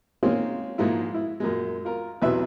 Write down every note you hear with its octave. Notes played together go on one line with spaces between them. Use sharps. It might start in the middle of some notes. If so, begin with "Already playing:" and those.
G#3 A#3 C4 C#4 D#4 F4
G#2 F3 G#3 A#3 E4
E4
F#2 A#2 G#3
F4 A#4
B1 E2 C3 F#3 B4 E5